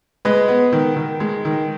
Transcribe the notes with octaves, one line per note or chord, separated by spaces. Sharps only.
G#3 B4 D#5
B3
D#3
D#3
G#3
D#3